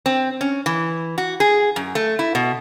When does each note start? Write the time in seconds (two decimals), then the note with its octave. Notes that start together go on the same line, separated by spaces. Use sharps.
0.06 C4
0.41 C#4
0.66 E3
1.18 F#4
1.40 G#4
1.76 F#2
1.95 A3
2.19 E4
2.35 B2